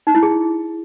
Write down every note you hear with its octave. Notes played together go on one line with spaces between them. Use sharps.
D#4
E4
G#4